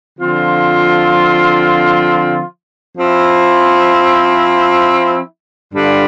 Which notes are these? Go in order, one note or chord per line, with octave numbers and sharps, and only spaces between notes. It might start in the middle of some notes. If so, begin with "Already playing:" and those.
D3 F3 C4 F4
F3 C4 E4
G2 D3 G3 D4 F4